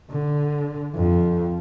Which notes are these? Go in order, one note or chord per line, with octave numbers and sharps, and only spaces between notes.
D3
F2